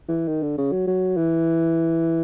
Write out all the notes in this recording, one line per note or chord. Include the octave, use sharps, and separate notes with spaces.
E3
D#3
D3
C#3
F#3
F#3
E3